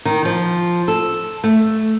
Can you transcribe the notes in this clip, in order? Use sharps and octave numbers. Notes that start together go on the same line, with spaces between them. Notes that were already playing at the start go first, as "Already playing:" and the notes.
D#3
F3
A4
A3